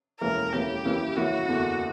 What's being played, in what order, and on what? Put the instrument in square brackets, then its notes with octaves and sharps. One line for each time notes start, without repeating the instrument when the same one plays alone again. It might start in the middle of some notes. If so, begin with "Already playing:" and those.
[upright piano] E1 D2 C#3 E3 A#3 [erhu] A#4
[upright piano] E1 D2 C#3 E3 A#3 [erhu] G4
[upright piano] F#2 C#3 E3 A#3 E4
[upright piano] F#2 C#3 E3 A#3 E4 [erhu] F#4
[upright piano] F#1 E2 D3